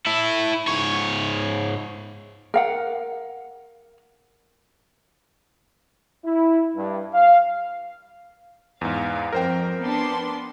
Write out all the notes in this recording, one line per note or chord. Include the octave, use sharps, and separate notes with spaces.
E4 A4
G#2 C#5
A#4 F5 F#5
E4
G2
F5
E2 G#2 F5
F2 A#4 C5 G5
B3 D4 C6